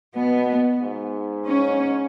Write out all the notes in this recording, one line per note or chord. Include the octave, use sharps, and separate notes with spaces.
B2 B3
G#2
C#4